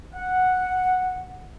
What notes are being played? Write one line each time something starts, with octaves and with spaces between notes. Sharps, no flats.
F#5